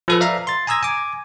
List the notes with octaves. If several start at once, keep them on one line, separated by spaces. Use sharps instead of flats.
F3 A4 B4
D5 E5 F5 A#5
C6 A6
G#5 A#5 D#6 E6 G#6 A#6
G#5 D6